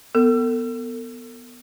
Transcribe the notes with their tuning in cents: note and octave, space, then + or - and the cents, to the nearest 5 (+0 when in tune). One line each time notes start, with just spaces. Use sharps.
B3 +0 A4 +40